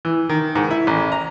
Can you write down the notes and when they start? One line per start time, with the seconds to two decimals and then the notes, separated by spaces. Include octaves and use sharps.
0.05 E3
0.29 D#3
0.55 G#2
0.71 E4
0.87 A1
1.12 A#5